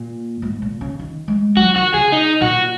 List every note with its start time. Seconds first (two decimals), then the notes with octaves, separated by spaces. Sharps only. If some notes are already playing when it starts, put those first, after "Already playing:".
Already playing: A#2
0.42 G#2
0.62 A#2
0.81 C#3
0.99 D#3
1.28 G#3
1.57 F#3 F#4
1.76 D#3 F#4
1.94 C#3 G#4
2.12 D#4
2.41 A#2 F#4